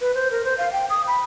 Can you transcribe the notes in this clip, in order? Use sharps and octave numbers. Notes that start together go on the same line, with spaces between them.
B4
C5
A#4
C5
F5
G5
D#6
B5